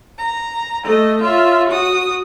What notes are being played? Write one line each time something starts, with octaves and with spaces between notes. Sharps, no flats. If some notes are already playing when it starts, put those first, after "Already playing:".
A#5
A3 D#5
F4 C#5 E5
F#4 D#6